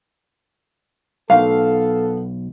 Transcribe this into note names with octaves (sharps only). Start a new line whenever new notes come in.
B1 B3 A4 F5